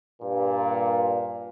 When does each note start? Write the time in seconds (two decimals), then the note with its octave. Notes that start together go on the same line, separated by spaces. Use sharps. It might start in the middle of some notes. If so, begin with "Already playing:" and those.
0.22 G2 A#2